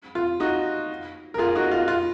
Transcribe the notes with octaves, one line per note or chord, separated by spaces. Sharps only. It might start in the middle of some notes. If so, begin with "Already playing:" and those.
F4
D#4 F#4
A#4
F4 G#4
D#4 F#4
F4
F4